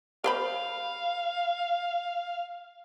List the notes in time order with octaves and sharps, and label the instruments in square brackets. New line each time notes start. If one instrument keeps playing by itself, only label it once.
[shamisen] A#4 C5 B5 [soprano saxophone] F5